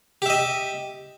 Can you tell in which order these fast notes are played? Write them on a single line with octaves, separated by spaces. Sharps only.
G4 E5 D#5